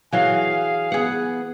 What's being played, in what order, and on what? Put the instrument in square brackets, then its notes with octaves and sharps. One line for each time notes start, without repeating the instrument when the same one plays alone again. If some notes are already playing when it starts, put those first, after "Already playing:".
[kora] E3 F#3 [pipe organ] G#4 [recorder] F5
[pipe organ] B3 [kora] G#4 F#5